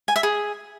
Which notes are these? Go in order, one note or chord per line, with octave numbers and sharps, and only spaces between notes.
G#5
E5
G#4